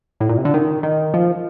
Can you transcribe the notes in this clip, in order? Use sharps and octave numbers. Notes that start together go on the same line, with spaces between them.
A2
A#2
C3
D3
D#3
D#3
F3